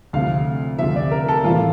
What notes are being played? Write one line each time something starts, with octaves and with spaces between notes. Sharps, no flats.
D2 C3 F3 F5
D2 C3 F3 E5
D5
A#4
A4
A2 E3 G3 F4